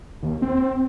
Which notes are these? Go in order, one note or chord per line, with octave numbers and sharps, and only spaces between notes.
D#2
C4